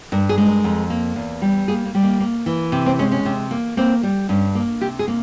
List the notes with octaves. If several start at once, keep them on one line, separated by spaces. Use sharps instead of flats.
G2 A#4
G#4
G#3
A#4
F2
A#3
E2
G3
A#3 G#4
A#3
G3
A#3
A#3
E3
C3
C4
G#3 C#4
C#4
C3
A#3
A#3 C4
G3
G2 C#4
A#3
C3 G4
G#4
A#3